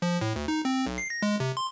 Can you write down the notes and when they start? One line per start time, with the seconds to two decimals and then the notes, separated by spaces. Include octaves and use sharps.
0.02 F3
0.21 A2
0.36 D2
0.48 D#4
0.65 C4
0.86 B1
0.98 C7
1.10 A#6
1.22 G#3
1.40 C3
1.57 C6